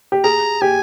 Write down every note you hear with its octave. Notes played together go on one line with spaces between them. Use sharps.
G4
G#4 A#5
G4 G#5